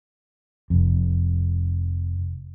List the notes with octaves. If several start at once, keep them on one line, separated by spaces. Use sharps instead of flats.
F1 F2